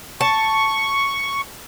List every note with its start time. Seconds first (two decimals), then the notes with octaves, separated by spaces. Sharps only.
0.21 A5 C#6